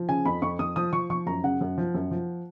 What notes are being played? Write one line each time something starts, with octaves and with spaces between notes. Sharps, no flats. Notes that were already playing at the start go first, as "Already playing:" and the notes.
Already playing: F3
C#3 G#5
F2 B5
F2 C#6
F2 D#6
F3 D#6
F3 C#6
F3 C#6
F#2 A#5
C#3 F#5
F#2
F3
F#2
F3